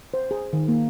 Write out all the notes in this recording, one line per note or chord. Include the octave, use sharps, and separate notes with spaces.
C5
G#4
D#3
A#3